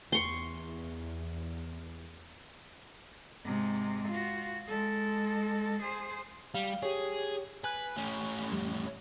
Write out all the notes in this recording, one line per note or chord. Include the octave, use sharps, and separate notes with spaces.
E2 C6 C#6
G#2 C3
F4 F#4
G#3 A4
G#4 C5
G3 F5
G4 G#4 C#5
B4 G#5 F#6
A2 C#4
F2 G3